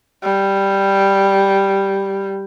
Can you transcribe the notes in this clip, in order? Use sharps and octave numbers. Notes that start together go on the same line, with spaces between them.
G3